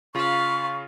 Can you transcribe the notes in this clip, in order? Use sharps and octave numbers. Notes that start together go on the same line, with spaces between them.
C#3 F4 F5 B5 C#6